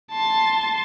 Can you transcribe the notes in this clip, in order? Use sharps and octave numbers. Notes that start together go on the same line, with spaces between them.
A5 C6